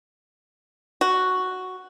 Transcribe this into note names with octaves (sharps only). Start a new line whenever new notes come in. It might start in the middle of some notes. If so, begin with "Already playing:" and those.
F#4